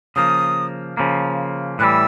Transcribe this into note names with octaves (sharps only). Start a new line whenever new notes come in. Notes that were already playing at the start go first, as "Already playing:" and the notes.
C#3 F3 A#3 D#6
C#3 F3 A#3
A2 E3 G3 E6 F#6